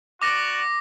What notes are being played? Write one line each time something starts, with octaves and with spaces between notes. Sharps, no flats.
B3 F#4 D5 D6 A#6